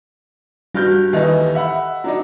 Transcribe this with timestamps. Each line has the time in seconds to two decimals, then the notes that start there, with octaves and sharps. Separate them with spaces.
0.74 G2 G3 F#4 F6 G6
1.13 D#2 E3 D#4 G4 A4 D#5
1.55 E5 F#5 B5
2.04 F#3 D4 D#4